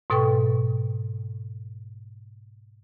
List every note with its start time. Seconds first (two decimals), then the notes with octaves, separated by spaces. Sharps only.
0.10 G#2 B2 A4 B4 G5 C#6